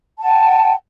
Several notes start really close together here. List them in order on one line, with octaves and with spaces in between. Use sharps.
A5 F#5 G5